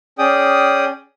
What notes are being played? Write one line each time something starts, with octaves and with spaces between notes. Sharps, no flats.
C#4 G#4 D5 G5 D#6